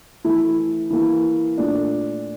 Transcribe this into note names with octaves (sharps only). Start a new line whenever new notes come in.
E3 A3 E4
E3 A#3 E4
A#2 A3 D4